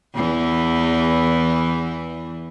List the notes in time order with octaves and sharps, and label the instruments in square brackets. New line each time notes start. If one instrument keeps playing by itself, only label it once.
[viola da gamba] E2 E3